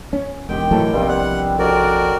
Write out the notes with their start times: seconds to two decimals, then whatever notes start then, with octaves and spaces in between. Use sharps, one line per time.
0.13 C#4
0.49 E1 D#3 C4 G4 G5
0.71 A2 E3 F#3 A4 A#4
0.93 A#1 G2 C3 B3 C4
1.09 G3 E4 F#5 F#6
1.58 F2 A#2 C#4 F#4 G4 A#4 D5